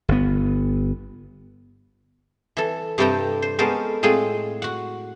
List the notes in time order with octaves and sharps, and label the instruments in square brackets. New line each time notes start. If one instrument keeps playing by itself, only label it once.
[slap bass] G1 B3
[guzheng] E3 A4
G2 C3 G3 A4 G5 A#5
C5
G#3 B3 C#4 A4 A#4 C5
A2 G#3 C4 F4 G#4
F#4 F#5